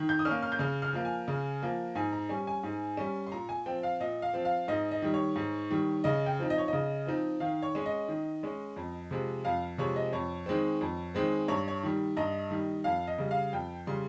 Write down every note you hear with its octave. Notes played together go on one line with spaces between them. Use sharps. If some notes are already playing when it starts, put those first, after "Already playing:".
Already playing: D#3
G6
D#6
C#4 F6
A#3
F6
G6
C#3 F6
F6
F3 A#3
G#5
C#3
F3 A#3
G#2 G#5
A#5
G3 C#4 G#5
G#5
G#2
G3 C#4
C6
A#2 A#5
G#5
F3 C4 G5
F5
A#2 D#5
F5
F3 C4
F5
G#2 D#5
D#5
D#3 G3
C#5
G#2
D#3 G3
C#3 D#5
G5
F3 C4 D#4
D#5
C#5
C#3 D#5
F3 C4 D#4
D#3 F5
C#5
G#3 C#4
D#5
D#3
G#3 C#4
F2
C3 F3 G#3
F2 F5
C3 F3 G#3 C#5
D#5
F2 C#5
D#3 G#3 C4
F2
D#3 G#3 C4
G2 C#5
C#5
D#3 G3
G2 D#5
D#3 G3
F2 F5
D#5
C#3 G3
F5
F2 G5
C#3 G3 C6